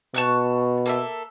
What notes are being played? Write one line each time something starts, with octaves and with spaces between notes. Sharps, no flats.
B2 A5 C#6 F#6
A#3 A4 E5